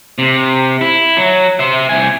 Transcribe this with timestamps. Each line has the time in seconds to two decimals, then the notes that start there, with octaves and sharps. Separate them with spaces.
0.18 C3
0.81 E4
1.17 F#3
1.59 C5 E5
1.89 C2 G#5